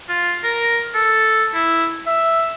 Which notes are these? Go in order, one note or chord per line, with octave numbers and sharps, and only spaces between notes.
F4
A#4
A4
E4
E5